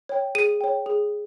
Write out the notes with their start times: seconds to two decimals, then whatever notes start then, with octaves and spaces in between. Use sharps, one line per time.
0.09 C#5 G5
0.35 G#4 D#7
0.61 C#5 G5
0.86 G#4